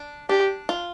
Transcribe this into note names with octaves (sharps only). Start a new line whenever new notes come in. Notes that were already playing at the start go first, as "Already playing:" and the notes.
Already playing: D4
D4 G4
F4